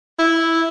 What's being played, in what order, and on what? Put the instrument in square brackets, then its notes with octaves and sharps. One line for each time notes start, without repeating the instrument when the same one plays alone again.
[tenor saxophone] E4